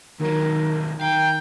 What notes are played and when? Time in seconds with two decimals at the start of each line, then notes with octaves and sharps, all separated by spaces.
0.20 D#2 D#3 F#3 A#4
1.01 D#3 F5 G5 A#5